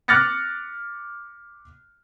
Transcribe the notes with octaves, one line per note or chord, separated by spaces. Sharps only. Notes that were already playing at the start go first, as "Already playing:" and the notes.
D6 F6 F#6 A6 A#6 C#7